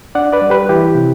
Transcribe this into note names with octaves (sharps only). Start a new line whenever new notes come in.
D4 D5 F#5
B4 D5
G3
G4 B4
E3 E4 G4
C3